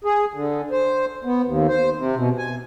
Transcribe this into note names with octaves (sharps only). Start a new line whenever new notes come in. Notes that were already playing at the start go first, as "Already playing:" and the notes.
G#4
D3
C5
B3
D#2
C5
C3
B2
G#5